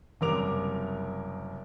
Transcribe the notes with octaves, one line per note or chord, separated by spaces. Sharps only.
F#1 C2 A#4 D6 F7